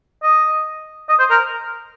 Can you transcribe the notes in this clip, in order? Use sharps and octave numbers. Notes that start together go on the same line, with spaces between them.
D#5
D#5
C5
A#4